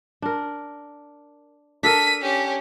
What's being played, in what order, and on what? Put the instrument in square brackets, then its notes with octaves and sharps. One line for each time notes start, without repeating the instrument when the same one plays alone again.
[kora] D4 A#4
[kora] D4 A4 A#4 [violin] B6 D#7
[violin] C#4 G4